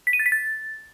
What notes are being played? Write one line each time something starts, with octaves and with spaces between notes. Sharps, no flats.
B6
D#7
A6
B6
A6